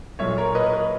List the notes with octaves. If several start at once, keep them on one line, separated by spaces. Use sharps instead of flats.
B1 A#2 C#5 E5
A#4 C#5
B4 D#5
B4 D#5